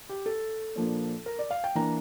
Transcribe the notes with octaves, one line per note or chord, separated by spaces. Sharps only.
G4
A4
A#2 F3 A#3 D4
A#4
D5
F5
G5
E3 A#3 D4 A#5